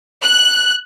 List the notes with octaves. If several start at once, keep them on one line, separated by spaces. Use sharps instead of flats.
F#6